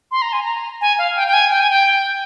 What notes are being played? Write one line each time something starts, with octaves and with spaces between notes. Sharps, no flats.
C6
A#5
G#5
A#5
G#5
F5
G5
G5
G#5
G5
G#5
G5